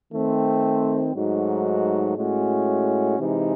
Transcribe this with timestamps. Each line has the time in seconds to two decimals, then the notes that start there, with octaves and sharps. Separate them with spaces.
0.12 D#3 A3 C4
1.14 G#2 F#3 A3 D#4 F#4
2.16 A2 G#3 C#4 F#4
3.18 C3 E3 G#3 D#4